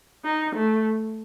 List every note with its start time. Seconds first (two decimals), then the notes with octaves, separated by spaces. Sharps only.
0.25 D#4
0.56 A3